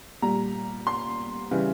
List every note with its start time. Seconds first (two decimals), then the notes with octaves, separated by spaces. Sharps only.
0.22 A#2 G3 A#5
0.87 C6
1.51 C#3 E3 G3